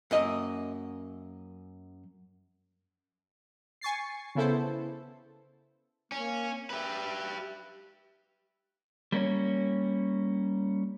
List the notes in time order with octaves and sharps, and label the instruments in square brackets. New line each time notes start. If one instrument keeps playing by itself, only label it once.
[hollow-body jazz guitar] F#2 A#3 D#5
[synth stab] G#5 C#6 A6 C7
C#3 B3 E4 A4 C5
[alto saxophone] A#3 [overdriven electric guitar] C#4
[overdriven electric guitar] G4 B4 [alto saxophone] E5
[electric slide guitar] G3 A#3 C#4 C#5